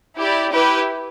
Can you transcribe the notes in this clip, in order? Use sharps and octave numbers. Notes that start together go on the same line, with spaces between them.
E4 G4 D5
E4 G4 B4